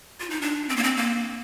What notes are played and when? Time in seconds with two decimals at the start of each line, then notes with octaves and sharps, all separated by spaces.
0.20 F4
0.30 D#4
0.41 D4
0.69 C4
0.76 A#3
0.83 C4
0.97 A#3